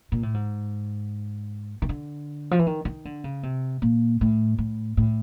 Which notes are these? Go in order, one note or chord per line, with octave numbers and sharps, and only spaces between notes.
A#2
A2
G#2
D#3
D3
F3
E3
D#3
D#3
D3
C#3
C3
A#2
A2
A2
A2